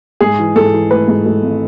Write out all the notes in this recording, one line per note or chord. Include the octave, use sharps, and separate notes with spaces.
G#2 G#4
E3
G#2 A4
E3
A3 B4
G#2
A3
G#1